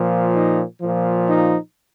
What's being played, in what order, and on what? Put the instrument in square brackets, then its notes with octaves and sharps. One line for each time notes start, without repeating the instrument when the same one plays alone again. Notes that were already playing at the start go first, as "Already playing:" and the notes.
Already playing: [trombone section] A#2 F3
D#4
A#2 F3
D#4